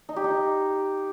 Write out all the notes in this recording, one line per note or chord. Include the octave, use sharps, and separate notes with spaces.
D#4
G4
D#4